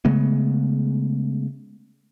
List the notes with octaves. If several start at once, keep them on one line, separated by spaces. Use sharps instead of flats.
C#3 G#3 A3 B3